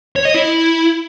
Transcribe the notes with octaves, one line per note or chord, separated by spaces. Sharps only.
C#5
D#5
E4